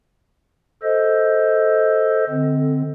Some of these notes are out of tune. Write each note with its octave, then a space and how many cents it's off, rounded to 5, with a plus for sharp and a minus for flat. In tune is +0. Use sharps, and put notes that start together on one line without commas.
A4 +0 C5 +0 D#5 +20
D3 +10 C4 -5